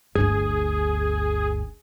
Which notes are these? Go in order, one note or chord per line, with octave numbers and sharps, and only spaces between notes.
G1 D2 G#4